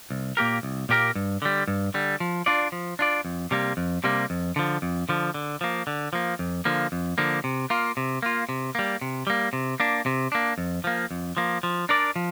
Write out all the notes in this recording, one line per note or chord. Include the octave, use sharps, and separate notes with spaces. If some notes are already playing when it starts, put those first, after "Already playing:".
C2
A#2 A#3 G4 A#4
C2
A#2 A#3 G4 A#4
G2
D3 G3
G2
D3 G3
F3
D4 F4 D5
F3
D4 F4 D5
F2
C3 G3 A#3
F2
C3 G3 A#3
F2
D3 F3
F2
D3 F3
D3
F3 A#3
D3
F3 A#3
F2
D3 F3 A#3
F2
D3 F3 A#3
C3
A#3 F4
C3
A#3 F4
C3
G3 A#3
C3
G3 A#3
C3
A#3 D4
C3
A#3 D4
F2
F3 A#3
F2
F3 A#3
F3
D4 A#4 D5
F3